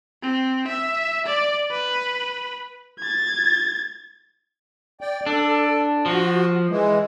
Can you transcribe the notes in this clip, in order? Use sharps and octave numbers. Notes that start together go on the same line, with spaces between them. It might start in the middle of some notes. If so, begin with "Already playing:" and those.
C4
E5
D5
B4
G#6 A6
D5 G5
D4 A4
F3 F#4
E3 G#3